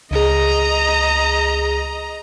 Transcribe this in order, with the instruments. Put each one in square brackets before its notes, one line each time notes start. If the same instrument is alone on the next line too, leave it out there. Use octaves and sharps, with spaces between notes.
[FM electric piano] C#2 G#4 [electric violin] D#5 A#5